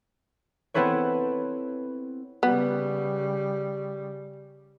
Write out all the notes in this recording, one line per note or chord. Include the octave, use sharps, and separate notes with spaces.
B3 C4 E4 A4 B4 C#5
C#3 G3 B3